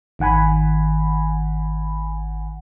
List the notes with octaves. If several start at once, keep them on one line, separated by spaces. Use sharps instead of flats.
G#1 D#3 F#5 G#5 B5